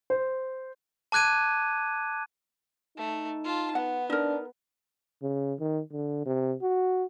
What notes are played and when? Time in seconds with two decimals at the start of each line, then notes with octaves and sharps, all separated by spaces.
0.10 C5
1.12 A5 D6 F#6 G#6 D#7
2.97 A3 D#4
3.44 F4 A5
3.75 B3 F#5
4.10 D4 D#4 A#4
5.23 C#3
5.60 D#3
5.92 D3
6.26 C3
6.62 F#4